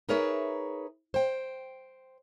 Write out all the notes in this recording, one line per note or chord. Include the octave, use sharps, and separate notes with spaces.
D#4 G#4 A#4 B4 C#5 E5
C5 G5